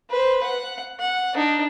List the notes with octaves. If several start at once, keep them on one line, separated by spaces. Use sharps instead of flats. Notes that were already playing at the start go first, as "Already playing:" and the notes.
B4 C5
F#5
F#5
D4 D#4